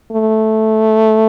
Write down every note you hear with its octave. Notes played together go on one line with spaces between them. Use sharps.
A3